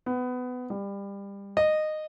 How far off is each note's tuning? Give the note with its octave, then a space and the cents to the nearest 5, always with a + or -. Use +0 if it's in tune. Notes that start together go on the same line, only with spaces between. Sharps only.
B3 +20
G3 +25
D#5 -15